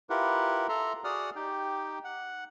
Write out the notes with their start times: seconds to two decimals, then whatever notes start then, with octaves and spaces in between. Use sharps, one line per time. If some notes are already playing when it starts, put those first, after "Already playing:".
0.10 E4 F4 G4 A#4 B4 F#5
0.69 A4 E5 A#5 C6
1.04 F#4 G#4 D5 F#5 D#6 F6
1.36 D#4 G4 G5
2.04 F#5